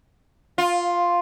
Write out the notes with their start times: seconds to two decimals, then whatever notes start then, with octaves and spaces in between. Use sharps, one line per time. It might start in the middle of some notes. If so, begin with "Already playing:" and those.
0.58 F4